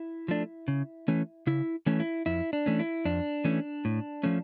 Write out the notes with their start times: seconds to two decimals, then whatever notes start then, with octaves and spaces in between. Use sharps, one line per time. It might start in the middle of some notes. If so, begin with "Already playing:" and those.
Already playing: E4
0.28 F3 A3 D4
0.68 C#3
1.08 E3 A3 C#4
1.47 C#3 E4
1.86 E3 A3 C#4
2.00 E4
2.26 F2 E4
2.53 D4
2.66 E3 A3 C#4
2.79 E4
3.05 F2 D4
3.44 E3 A3 C#4
3.85 A2
4.23 F3 A3 C#4